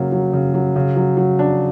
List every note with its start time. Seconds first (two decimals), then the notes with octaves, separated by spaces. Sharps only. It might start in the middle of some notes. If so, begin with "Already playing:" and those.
Already playing: C#3 F#3 A#3
0.12 F#3
0.33 C#3
0.54 F#3
0.76 C#3
0.96 F#3
1.17 F#3
1.39 D4